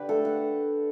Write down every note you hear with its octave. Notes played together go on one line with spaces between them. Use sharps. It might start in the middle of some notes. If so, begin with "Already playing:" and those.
Already playing: D3 G4 B4 D5
A3 A4
F#5